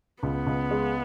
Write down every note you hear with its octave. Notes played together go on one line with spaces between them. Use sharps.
C#2 B3
C#2
G#3